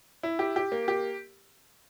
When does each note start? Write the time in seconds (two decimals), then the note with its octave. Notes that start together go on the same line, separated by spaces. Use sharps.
0.23 E4
0.39 G4
0.56 G4
0.72 A#3
0.88 G4